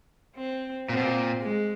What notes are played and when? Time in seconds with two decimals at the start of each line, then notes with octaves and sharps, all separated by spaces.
0.36 C4
0.89 A#2 C4
0.97 B2
1.04 A#2
1.42 G#3